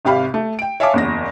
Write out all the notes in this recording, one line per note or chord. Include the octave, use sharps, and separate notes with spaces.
G#1 C3 G4 F5 B5
A3
G5 D7
C#5 E5 F5 G#5 A5 D6
F#1 E2 A#6